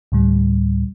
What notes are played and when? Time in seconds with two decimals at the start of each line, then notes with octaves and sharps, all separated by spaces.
0.12 D2 A2 G3